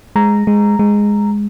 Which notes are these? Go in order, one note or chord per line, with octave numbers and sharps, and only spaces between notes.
G#3 A#5
G#3
G#3